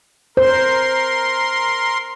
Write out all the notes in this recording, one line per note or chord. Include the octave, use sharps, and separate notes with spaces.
A#4 C5 C6